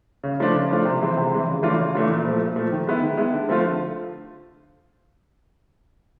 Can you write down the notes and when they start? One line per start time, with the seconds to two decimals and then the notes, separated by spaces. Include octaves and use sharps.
0.24 C#3
0.40 F3 A3 D4 F4
0.55 C#3
0.70 F3 A3 D4 F4
0.85 C3
1.02 E3 G#3 C4
1.17 C3
1.32 E3 G#3 C4
1.47 C#3
1.63 E3 A3 D4 F4
1.79 C#3
1.95 E3 A3 D4 F4
2.10 A#2
2.25 F3 A3
2.41 A#2
2.56 F3 A3
2.72 D#3
2.87 G#3 B3 E4
3.03 D#3
3.17 G#3 B3 E4
3.33 D3
3.49 F3 A3 C4 F4
3.64 D3